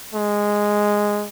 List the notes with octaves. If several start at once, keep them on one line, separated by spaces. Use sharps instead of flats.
G#3